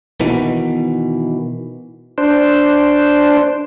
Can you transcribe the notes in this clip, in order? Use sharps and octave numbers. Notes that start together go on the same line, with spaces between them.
B2 D#3 E3
D4 C5